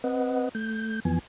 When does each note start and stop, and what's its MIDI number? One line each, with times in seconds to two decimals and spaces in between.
0.04 0.49 60
0.04 0.49 71
0.04 0.49 75
0.04 0.49 78
0.55 1.00 57
0.55 1.00 91
1.05 1.19 41
1.05 1.19 52
1.05 1.19 53
1.05 1.19 59
1.05 1.19 80